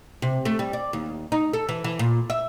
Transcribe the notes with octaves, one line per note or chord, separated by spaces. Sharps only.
C3
A3
G3
D5
D#2
D#4
A4
E3
E3
A#2
E5